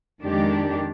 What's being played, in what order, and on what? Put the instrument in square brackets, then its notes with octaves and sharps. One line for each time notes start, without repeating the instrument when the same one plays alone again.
[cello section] F2 D#3 G#3 D4 G4